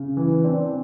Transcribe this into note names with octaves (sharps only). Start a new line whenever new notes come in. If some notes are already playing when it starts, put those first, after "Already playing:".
Already playing: C#3
E3
C4 D4